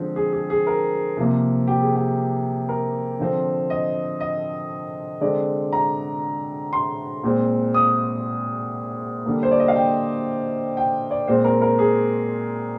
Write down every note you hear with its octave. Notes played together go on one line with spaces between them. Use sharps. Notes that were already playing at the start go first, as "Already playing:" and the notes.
Already playing: D3 F3 G#3 C4
G#4
G#4
G#4
A#4
C3 F3 A#3
G4
G#4
G4
A#4
D3 F3 C4
D#5
D#5
D3 G#3 C4 D5
A#5
C6
A#2 G#3 C4
D#6
D3 G3 A#3
C5
D5
D#5
F5
G5
G5
D5
A#2 G#3 C4 C5
A#4
A#4
G#4